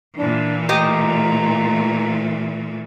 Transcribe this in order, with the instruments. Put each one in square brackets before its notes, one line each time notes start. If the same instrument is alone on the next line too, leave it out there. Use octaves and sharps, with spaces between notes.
[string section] A#2 E3 [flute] D4
[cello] A3 [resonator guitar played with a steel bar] G4 D#5 [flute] A#5